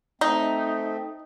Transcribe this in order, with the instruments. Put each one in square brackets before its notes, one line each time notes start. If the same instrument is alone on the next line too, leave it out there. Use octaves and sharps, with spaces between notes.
[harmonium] A3 C4 [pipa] D#4